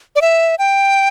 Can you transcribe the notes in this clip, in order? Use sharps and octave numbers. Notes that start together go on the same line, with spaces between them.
D5
E5
G5